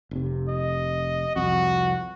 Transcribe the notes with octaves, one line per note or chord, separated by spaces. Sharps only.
F1 C3
D#5
C2 F2 F#4